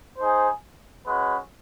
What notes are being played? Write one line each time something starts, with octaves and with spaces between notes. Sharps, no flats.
D#4 G#4 C5
G#3 C#4 F#4 B4